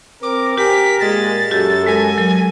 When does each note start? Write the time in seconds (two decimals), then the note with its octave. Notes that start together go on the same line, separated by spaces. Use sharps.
0.23 C4 A#4 D6
0.58 G4 A#4 G5 G#5 B6
1.00 A#2 G#3 A6
1.51 F#2 F#4 G4 A4
1.86 G#3 A#4 G#5
2.18 F#3 A#4